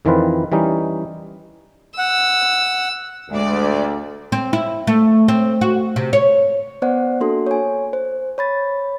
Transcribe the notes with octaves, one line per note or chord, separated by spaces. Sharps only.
F2 D#3 E3 C4 F4 B4
E3 G3 C#4 D#4
F#5 E6
D2 G#3 D5
C4
E4
A3
C4
F#4
C3
C#5
B3 C5 D5 F#5
A#3 D4 F#4 A4 C6
C#5 G#5
C5
C#5 B5 A6